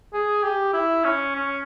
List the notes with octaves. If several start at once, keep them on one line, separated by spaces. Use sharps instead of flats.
G#4
G4
E4
C#4
C#4